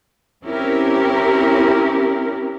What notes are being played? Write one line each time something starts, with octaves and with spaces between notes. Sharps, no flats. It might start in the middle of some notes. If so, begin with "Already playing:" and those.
C4 C#4 E4 G4 A#4